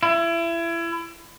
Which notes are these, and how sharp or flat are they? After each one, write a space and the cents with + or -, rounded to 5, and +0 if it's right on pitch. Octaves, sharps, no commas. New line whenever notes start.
E4 +30